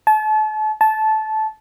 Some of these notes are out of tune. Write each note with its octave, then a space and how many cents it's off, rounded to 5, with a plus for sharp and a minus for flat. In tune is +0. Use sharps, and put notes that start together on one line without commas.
A5 -35
A5 -15